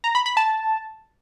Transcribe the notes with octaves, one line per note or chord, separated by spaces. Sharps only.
A#5
B5
B5
A5